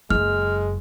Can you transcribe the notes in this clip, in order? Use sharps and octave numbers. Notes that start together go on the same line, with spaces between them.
F#1 F#2 G#3 F6